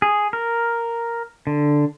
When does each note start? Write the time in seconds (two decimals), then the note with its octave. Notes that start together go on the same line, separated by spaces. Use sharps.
0.02 G#4
0.33 A#4
1.47 D3